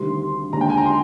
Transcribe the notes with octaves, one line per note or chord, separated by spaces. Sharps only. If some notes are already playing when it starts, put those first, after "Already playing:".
Already playing: D2 C3 D#3 G3 C6
D#2 D3 G#3 D4 A#5
G5
G#5
A#5
C6